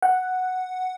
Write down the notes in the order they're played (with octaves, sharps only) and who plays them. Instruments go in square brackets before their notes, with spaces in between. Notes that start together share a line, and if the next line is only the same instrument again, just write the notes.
[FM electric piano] F#5